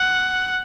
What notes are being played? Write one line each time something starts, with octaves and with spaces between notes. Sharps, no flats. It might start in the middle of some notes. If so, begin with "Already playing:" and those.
Already playing: F#5